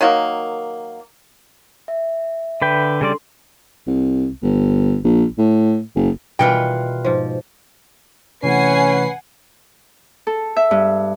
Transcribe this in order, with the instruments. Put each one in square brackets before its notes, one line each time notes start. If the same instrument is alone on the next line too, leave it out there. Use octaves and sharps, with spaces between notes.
[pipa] D#3 F#3 A#3
[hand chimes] E5
[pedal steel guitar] D3 B4 G5
[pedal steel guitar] C#3 G3 D5 [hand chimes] D4 A4 C6
[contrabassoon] C2
G1
A#1
A2
F#1
[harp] B2 G3 C#7 [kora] D#3 E3 [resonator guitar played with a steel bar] F4 B4 G5
[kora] G#2 F3
[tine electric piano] C3 E3 A3 [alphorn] C#4 [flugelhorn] B4 [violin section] F#5 G#5 C7
[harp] A4
E5
G2